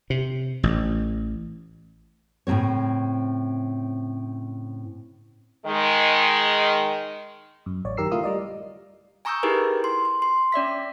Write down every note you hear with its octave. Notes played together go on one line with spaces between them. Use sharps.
C3
A1
A2 C#3 F#3 C4 C#5
D#3 G#3
F#2
A1 C#5 D5
F#2 D#3 G4 A#4 E6 C7
C#3 A3 E4 F4 A#4 D#6
G3 D5 D#5
G#5 A#5 C#6 D#6 E6 G6
D#4 E4 G4 G#4 A#4 B4
C6
C6
C6
C#4 D5 E5 B6